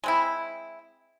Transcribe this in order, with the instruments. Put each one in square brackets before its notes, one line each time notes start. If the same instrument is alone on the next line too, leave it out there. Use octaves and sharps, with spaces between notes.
[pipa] G#3 C4 E4